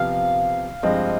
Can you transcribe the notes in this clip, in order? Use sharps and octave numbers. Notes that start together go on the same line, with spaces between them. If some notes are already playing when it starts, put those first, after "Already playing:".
Already playing: C3 F3 B3 F5
G2 F3 G#3 C4 D#5